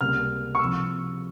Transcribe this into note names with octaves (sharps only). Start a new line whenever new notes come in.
C#2 C3 G3 A#3 F6
C#6
C2 C3 F3 E6